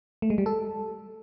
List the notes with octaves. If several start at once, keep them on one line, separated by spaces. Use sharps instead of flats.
A3
G#3
G3
A4